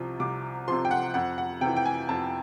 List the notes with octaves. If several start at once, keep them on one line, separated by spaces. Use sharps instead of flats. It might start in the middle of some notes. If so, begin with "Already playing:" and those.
Already playing: C2 C3 F3
C2 D6
C3 F3 C6
G5
F#5
F2 F#5
F#5
C3 E3 G5
G5
G#5
F2 A5